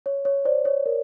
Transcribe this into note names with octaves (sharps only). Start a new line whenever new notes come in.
C#5
C#5
C5 D5
C#5
A#4